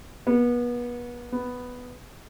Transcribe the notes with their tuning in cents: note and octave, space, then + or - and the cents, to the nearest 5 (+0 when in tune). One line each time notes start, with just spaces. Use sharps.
B3 -30
B3 +5